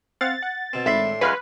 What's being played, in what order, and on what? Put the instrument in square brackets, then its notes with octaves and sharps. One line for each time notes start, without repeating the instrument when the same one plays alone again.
[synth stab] C4 F5 F#5 [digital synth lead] A6
[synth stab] F#5
[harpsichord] B2 C4
[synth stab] G#1 B5 [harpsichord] A2 D4 C6 [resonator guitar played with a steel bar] E5
[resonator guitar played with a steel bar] F#2 G#3 F4 [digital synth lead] B4 [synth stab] B5 F6 C7